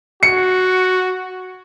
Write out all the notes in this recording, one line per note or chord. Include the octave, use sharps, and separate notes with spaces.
F#4 C#7